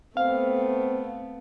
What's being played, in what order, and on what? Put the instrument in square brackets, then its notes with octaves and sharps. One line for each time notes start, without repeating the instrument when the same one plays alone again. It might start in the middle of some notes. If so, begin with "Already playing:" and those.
[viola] A3 B3 [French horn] C4 [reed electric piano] F5